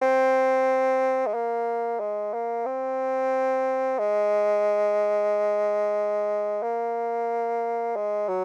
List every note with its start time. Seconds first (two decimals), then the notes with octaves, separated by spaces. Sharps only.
0.02 C4
1.27 G#3
1.34 A#3
2.00 G#3
2.34 A#3
2.66 C4
3.99 G#3
6.63 A#3
7.96 G#3
8.28 F#3